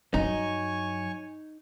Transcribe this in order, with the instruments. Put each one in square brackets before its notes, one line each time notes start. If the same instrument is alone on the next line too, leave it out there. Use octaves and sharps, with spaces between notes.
[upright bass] G2 F#3 [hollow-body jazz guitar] D#4 [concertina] C#5 G#5 C#6